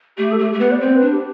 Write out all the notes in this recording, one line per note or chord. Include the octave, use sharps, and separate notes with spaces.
A3 G4
A4
A3 G4
A3
B3 B4
D5
C4 C5
B4
D4
G4